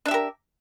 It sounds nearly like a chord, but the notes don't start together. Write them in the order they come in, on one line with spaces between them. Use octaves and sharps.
D4 E5 G4 A#4